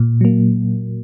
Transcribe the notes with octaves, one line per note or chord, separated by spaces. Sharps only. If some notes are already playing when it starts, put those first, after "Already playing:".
Already playing: A#2
F#3 A#3